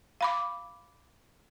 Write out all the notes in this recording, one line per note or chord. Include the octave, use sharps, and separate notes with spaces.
F5 B5 D6